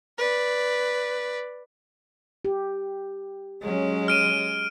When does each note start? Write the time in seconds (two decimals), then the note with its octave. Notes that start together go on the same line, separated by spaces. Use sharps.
0.18 B4 D5
2.45 G4
3.62 F#3 G#3 C#4
4.08 F6 D7 D#7